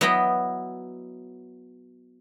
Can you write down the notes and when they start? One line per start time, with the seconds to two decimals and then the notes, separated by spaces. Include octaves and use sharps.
0.01 F#3 B3 E4 D#5 G5 B5